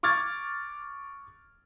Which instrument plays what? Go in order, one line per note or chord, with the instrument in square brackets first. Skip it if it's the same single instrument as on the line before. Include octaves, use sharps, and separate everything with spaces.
[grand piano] C#6 D6 F6 G#6 A6